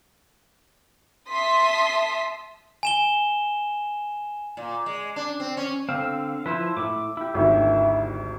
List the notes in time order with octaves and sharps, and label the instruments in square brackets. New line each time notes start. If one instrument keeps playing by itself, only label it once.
[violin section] E5 A5 C6 D#6 B6
[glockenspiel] G#5 E7 G7
[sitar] A#2
G#3
D4
C4
C#4
[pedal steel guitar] D3 C4 [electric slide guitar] F5
[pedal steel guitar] F3 E4 C5 [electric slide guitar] B4
[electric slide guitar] A2 E4 [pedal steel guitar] D6
[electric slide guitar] E4 G4
[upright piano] G#1 D2 D#3 [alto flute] E5